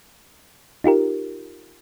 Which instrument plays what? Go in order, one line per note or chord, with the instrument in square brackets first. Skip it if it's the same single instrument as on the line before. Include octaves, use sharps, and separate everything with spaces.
[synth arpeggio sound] D#4 F4 G4 A#4